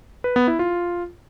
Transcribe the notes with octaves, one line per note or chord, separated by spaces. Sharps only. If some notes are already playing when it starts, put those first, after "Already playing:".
B4
B3
E4
F4